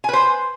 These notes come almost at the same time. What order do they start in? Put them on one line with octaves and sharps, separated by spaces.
G#5 B4 C5